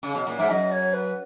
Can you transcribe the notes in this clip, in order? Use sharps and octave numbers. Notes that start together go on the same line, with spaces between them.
C#3
B2
A#2
G#2 E5
F#2 D#5
C#5
B4